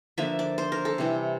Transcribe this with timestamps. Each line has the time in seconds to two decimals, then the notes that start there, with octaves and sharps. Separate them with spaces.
0.18 D3 F3 A#3 E5
0.39 D5
0.58 C5
0.72 A#4
0.85 A4
0.98 C3 E3 G3